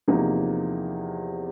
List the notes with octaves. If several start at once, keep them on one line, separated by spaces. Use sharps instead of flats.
E2 C3 F3 A#3 D#4